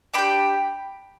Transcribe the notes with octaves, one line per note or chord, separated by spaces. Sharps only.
D4 G4 G5 B5